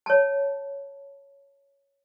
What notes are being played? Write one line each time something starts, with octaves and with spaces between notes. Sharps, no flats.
C#5 A5